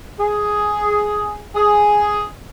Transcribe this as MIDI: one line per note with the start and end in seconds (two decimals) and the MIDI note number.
0.19 1.40 68
1.55 2.26 68